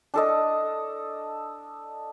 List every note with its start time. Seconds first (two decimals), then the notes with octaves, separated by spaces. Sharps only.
0.14 D4 A4 D#5